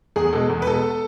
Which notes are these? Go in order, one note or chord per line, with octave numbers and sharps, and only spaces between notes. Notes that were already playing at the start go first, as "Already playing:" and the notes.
E2 G#4
B2 G#3 A4
E2
B4
B2 G#3 A4